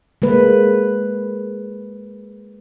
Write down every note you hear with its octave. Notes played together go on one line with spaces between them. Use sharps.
G#3 A#3 B4